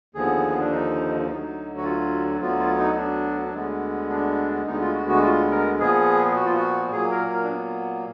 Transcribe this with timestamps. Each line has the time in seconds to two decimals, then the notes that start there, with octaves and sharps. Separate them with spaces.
0.15 D#2 D3 F3 B3 G#4
0.49 B3
0.60 D4
0.72 D#4
1.27 D2 D3 F#3 D#4
1.77 F#4
1.84 F4
2.40 D2 D3 F#3 B3 F4
2.59 F4
2.78 D#4
2.97 D4
3.45 D4
3.54 D2 D3 G#3 B3
4.10 D4
4.66 D2 D3 G#3 B3 D#4
4.81 F4
4.94 F#4
5.09 F#4
5.23 F4
5.51 A#4
5.79 A#2 F3 B3 G#4
6.36 F#4
6.46 F4
6.55 F#4
6.92 A#2 F#3 A#3 G#4
7.11 A#4
7.30 A#4
7.44 D4
7.49 B3